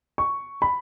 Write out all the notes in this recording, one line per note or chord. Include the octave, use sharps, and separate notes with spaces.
C#6
B5